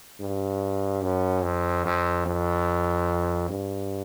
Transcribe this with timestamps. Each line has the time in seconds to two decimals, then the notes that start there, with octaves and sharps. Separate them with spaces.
0.20 G2
1.03 F#2
1.43 F2
1.85 F2
2.26 F2
3.50 G2